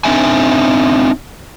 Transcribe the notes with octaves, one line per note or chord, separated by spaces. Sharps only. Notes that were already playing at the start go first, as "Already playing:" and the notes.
C4 D4 D#4 E5 G#5